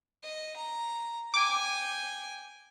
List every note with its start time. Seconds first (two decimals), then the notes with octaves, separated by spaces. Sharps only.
0.23 D#5
0.57 A#5
1.34 G5 G#5 D6